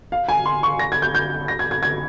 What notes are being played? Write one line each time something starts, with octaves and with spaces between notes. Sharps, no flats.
F5
G#5
C6
C#6
A#6
G#6
G6
G6
A#6
G#6
G#6
G#6